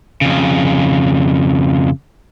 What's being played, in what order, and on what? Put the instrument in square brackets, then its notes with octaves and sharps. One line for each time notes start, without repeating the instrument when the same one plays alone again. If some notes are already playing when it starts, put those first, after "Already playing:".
[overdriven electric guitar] F2 C#3